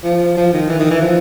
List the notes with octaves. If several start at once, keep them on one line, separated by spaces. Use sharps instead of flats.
F3
F3
D#3
E3
D#3
E3
F3